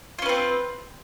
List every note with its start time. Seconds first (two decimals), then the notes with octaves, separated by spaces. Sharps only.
0.19 F4
0.22 C#4
0.26 B4
0.29 C4